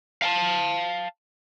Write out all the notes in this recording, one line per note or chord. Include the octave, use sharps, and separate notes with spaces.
F5 G5 A5